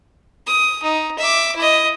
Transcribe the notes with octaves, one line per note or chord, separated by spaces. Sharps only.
D#6
D#4
E5 D6
E4 D#5